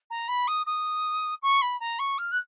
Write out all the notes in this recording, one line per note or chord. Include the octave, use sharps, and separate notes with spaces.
A#5
B5
D#6
D#6
C#6
B5
A#5
C#6
F6
F#6